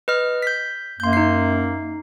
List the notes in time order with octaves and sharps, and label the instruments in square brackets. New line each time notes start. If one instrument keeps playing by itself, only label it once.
[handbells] B4 D#5 F6
G6 B6
[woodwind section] F#2 A#3 [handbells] C6 G6
[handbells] D#4 C7